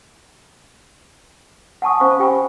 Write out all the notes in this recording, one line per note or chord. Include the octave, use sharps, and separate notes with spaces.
F#5 G#5 A5 C#6 D#6
C#4 C5 F5 B5 C#6
G4 G5 G#5 B5